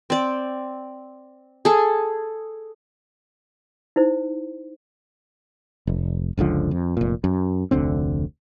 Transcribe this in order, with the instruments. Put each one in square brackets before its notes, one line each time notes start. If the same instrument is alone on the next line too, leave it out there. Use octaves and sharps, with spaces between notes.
[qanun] C4 D5
G#4 A4
[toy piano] D#4 E4 C5
[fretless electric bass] F1
F#1 C#2 D3 F3
F2
F1 A#2
F#2
F1 D2 D3 C4